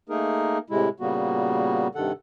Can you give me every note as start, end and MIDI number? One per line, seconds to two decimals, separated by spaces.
0.09 0.58 57
0.09 0.58 58
0.09 0.58 63
0.09 0.58 68
0.09 0.58 70
0.70 0.89 45
0.70 0.89 48
0.70 0.89 56
0.70 0.89 64
1.00 1.88 46
1.00 1.88 49
1.00 1.88 55
1.00 1.88 58
1.00 1.88 59
1.00 1.88 66
1.95 2.12 43
1.95 2.12 48
1.95 2.12 51
1.95 2.12 69
1.95 2.12 78